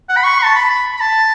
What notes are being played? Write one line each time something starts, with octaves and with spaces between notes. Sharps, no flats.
F#5
B5
C#6
A5
B5
B5
B5
A5